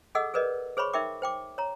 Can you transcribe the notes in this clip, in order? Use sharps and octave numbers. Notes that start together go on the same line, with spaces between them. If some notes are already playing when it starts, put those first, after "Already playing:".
G#4 A4 D#5 F#5 E6
G#4 A#4 B4 D5 D#5
G#4 C5 C#5 B5 C#6
D#4 A#4 E5 G5 D6
C5 G5 D6
C#5 A#5